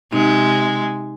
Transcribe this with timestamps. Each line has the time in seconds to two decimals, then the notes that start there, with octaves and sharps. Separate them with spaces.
0.13 C3 G#3 D#4